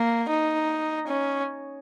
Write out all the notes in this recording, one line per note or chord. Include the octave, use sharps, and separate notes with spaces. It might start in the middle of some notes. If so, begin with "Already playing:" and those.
Already playing: A#3
D#4
C#4